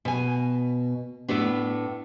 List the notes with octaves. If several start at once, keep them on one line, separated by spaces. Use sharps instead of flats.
B2 G#5
A2 A3 B3 D4